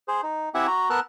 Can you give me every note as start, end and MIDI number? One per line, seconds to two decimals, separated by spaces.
0.08 0.21 68
0.08 0.21 72
0.23 0.49 63
0.55 0.67 60
0.55 0.67 64
0.55 0.67 67
0.55 0.67 76
0.55 0.67 78
0.55 0.67 80
0.67 0.89 66
0.67 0.89 82
0.90 1.00 59
0.90 1.00 70
0.90 1.00 81
0.90 1.00 88
0.90 1.00 90